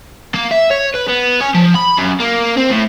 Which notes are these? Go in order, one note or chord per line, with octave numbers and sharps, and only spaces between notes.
A#3
E5
C#5
B4
B3
C#4
F3
B5
F#2
A#3
C4
A2